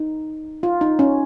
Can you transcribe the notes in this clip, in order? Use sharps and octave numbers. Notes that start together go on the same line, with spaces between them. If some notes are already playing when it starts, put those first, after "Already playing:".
Already playing: D#4
F4
D#4
C#4